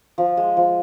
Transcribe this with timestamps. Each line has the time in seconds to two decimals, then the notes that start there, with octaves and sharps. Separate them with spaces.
0.18 F3
0.37 G#3
0.57 F3